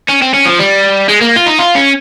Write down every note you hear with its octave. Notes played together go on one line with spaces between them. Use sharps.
C#4
C4
C#4
F3
G3
G#3
A#3
F4
D#4
F4
C#4